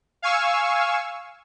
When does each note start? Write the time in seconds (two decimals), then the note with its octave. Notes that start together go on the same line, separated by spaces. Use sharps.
0.22 F5 G#5 C#6 E6